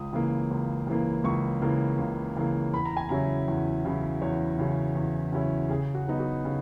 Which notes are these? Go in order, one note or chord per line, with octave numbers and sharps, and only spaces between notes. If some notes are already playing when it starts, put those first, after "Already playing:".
Already playing: C#2 D#6
C#3 E3 A#3
C#2
C#3 E3 A#3
C#2 C#6
C#3 E3 A#3
C#2
C#3 E3 A#3
E2 B5
A#5
G#5
C#3 F#3 C#4 E4 A#5
E2
C#3 F#3 C#4 E4
E2 C#5
C#3 F#3 C#4 E4
E2
C#3 F#3 C#4 E4
C#3 G#4
F#4
F#3 B3 D#4
F#4
C#3